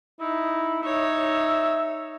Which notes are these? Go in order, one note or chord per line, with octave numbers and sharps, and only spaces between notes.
D#4 E4
D#4 C#5 E5